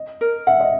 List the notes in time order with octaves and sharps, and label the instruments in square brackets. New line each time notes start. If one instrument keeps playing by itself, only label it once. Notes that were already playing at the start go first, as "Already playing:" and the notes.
Already playing: [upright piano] D#5
[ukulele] A#4
[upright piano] E5 [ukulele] F#5
[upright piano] D#5